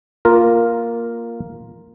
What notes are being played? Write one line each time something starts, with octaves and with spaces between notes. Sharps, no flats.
A#3 F4 A#4